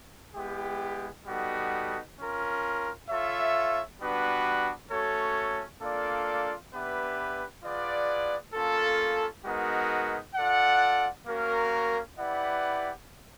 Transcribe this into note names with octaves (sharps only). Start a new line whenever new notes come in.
G#3 B3 E4 G4
G3 B3 D#4 F#4 A4
C#4 F4 A#4
F4 A4 C#5 E5
G3 B3 D4 F#4 B4
A3 C#4 F#4 A4 C#5
A#3 D4 F4 A4 D5
B3 D4 G4 B4 E5
F4 G#4 B4 D5 F#5
A#3 C#4 F4 A4
G#3 B3 D#4 F#4 A#4
F4 A4 D5 F#5
A#3 C#4 F#4 A#4
E4 G4 B4 D5 F#5